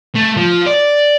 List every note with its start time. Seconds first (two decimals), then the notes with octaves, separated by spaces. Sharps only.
0.15 A3
0.37 F3
0.66 D5